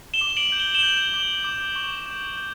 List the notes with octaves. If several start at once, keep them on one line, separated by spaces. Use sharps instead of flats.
E7 G7
D6
G7
D7 F#7
G6
G7
E7 G7
G6
D6
D6
C#6
G6
G6